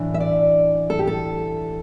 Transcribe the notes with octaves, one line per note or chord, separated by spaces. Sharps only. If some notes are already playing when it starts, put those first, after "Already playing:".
Already playing: A2 E3 D4
E5
D5
A4
G4
A4